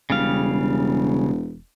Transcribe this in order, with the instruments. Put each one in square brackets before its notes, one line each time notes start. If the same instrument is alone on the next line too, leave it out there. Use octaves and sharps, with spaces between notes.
[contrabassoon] E1 [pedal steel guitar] C#3 G3 F5